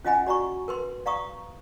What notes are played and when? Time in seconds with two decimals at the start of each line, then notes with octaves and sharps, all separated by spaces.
0.05 C#4 F4 D#5 F#5 G#5 B5
0.27 F#4 D5 A#5 B5 C#6
0.68 A#4 B4 C6
1.06 D5 F5 A#5 C#6 D#6